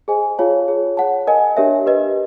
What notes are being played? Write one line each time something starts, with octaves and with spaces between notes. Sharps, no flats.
G#4 C5 D#5 G#5
F4 G#4 C#5 F5 A5
F4 G#4 C#5
C#5 F#5 A5
A#4 D#5 G#5
D4 G4 A#4 C#5 E5
G4 B4 D#5